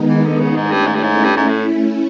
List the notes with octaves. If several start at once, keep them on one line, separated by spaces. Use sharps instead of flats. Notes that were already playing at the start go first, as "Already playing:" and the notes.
Already playing: D#3 G#3 B3 D#4
E3
D3
C#3
G#2 A3 C#4 E4
G2
G#2
G2
G#2
G2
G#2
A2